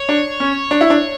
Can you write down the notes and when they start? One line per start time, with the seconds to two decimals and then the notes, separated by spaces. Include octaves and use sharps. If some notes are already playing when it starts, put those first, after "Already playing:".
Already playing: C#5
0.09 D4
0.40 C#4
0.71 D4
0.81 E4
0.90 D4